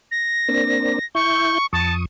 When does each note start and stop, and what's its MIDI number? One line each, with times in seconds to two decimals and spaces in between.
0.11 1.04 94
0.48 0.99 58
0.48 0.99 60
0.48 0.99 62
1.15 1.58 64
1.15 1.66 85
1.15 1.58 91
1.73 2.05 41
1.73 1.94 81
1.73 2.05 85
1.73 2.05 87